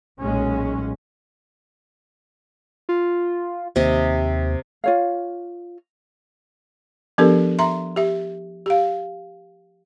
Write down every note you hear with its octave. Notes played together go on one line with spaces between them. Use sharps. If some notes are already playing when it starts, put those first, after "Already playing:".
B1 A#2 G#3 C#4
F4
D#2 C3 D#5
F4 C#5 F5
F3 B3 D4 G4 A4 A#4
E5 A#5 C6
G4 E5
G4 F5